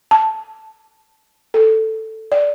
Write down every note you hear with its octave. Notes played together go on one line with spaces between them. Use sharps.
A5
A4
D5